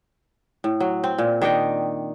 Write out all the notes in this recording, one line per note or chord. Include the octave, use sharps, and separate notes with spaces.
A2
F#3
C4
A#2
D#3 D4 D#5 G5